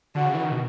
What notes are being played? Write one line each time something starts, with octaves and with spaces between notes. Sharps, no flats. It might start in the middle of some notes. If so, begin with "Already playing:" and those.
D3 F#4
C#3
E3
D#3
B2